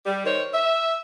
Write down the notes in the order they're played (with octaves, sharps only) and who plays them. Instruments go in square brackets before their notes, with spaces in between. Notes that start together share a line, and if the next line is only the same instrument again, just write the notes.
[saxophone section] G3
D#3 C5 C#5
E5